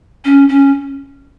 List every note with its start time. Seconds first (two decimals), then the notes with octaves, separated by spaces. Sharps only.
0.25 C#4
0.49 C#4